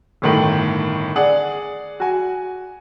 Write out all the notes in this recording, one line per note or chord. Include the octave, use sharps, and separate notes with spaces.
G1 A2 D#3
G#4 D5 F#5
F#4 G#5